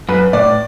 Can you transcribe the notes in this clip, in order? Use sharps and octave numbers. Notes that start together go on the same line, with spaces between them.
F#2 B4
A2 D5